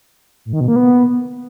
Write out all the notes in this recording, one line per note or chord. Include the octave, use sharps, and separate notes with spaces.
A2
D#3
B2
A#3
B3